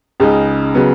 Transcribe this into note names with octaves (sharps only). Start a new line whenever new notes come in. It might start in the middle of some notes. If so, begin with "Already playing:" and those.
C#2 C#3 G#3 D#4
C#3 F#3 B3